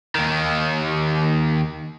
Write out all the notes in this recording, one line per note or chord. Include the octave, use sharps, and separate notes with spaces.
D#2 D#3